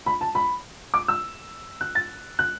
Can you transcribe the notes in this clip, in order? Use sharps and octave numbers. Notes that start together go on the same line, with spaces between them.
B5
A5
B5
D6
E6
F#6
A6
F#6